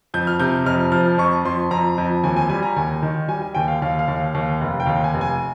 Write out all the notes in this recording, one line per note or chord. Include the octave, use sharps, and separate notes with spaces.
F2 G6
F6
C3 G6
F2 F6
F3 F6
F2 C#6
F2 C6
F2 A#5
F2
D#2 G#5
G#5
G3 G#5
A#5
D#2 G#5
D#3
G3 G#5
G#5
D#2 G5
F5
D#2 F5
F5
D#2
F5
D#2 F5
F1
G5
D#2 F5
G#5
F1
G#5